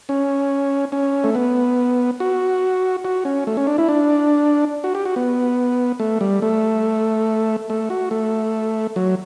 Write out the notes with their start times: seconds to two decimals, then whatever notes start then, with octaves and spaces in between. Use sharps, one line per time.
0.09 C#4
0.92 C#4
1.24 A3
1.35 B3
2.20 F#4
3.05 F#4
3.25 C#4
3.47 A3
3.57 C#4
3.67 D4
3.78 E4
3.89 D4
4.84 F#4
4.95 G4
5.05 F#4
5.16 B3
5.99 A3
6.21 G3
6.42 A3
7.70 A3
7.90 F#4
8.11 A3
8.96 F#3